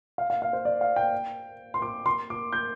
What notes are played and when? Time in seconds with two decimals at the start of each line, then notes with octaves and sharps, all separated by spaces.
0.18 F5
0.30 F5
0.42 F5
0.53 C5
0.65 D5
0.81 F5
0.96 G5
1.74 C6
1.82 D6
2.06 C6
2.30 D6
2.53 G6